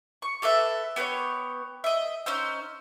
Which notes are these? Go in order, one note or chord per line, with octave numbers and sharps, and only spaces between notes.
C#6
G4 A4 B4 E5
B3 G4 A#4 C#5
D#5 E5
C#4 D#4 C5 E6